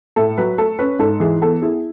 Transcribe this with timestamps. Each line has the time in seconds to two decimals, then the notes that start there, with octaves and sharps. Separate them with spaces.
0.16 A2 A4
0.37 F#3 B4
0.58 A3 A4
0.79 C#4 B4
0.99 G#2 A4
1.20 E3 G#4
1.41 B3 A4
1.62 E4 G#4